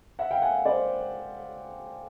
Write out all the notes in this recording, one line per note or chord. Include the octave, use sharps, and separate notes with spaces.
E5 F#5
F5 G5
F#5 G#5
C5 D5